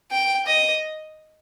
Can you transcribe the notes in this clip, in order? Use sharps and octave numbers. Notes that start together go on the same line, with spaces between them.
G5
D#5